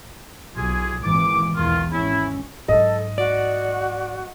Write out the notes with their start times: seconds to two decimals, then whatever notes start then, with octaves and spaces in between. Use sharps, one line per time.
0.56 B1 F4 G4 G#4
1.03 G#1 A#2 E3 D6
1.55 B1 E2 D#3 F4
1.91 G#1 C#4 E4
2.68 G#2 F#3 A4 D#5
3.18 F#4 D5